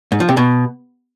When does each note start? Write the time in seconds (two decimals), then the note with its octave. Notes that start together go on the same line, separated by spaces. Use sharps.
0.12 G#2
0.20 F3
0.29 C3
0.37 B2